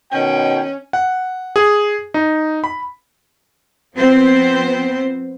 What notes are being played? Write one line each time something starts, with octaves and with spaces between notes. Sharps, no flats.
B2 D#3 C#4 G5
F#5
G#4
D#4
B5
F3 B3 C4 C5